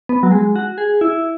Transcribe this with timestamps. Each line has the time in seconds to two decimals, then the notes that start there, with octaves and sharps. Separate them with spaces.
0.09 B3
0.23 F#3
0.32 G#3
0.56 F#4
0.78 G#4
1.01 E4